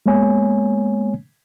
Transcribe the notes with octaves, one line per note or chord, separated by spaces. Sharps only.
G#3 A#3 B3 C#5 G#5